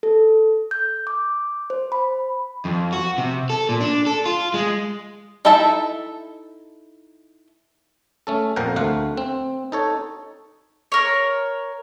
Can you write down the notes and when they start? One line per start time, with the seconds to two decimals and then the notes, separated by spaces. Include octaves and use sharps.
0.03 A4
0.71 G6
1.07 D6
1.70 C5
1.92 B5
2.65 F2
2.92 F#4
3.18 C3
3.50 A4
3.69 A#2
3.81 D4
4.07 A4
4.26 F4
4.54 G#3
5.45 D#4 E4 A4 E5 A5
8.27 A3 C#4 A4
8.56 F2 A#2 F3 A#4 F#5 G5
8.76 D2 A3 F5 F#5
9.17 C4
9.72 D#4 A4 C#5
10.92 A#4 C#5